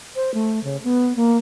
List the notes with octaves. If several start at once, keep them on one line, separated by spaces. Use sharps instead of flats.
C5
A3
C#3
B3
A#3